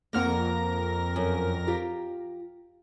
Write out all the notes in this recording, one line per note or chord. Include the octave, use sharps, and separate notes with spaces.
F2 A#3 A#4 F#5 A#6
F#2
F4 G4